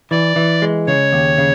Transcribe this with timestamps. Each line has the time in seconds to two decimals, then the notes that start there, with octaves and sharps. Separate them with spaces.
0.11 E3 D5
0.36 E3
0.62 G#3
0.87 C#3 C#5
1.13 D#2
1.38 C#3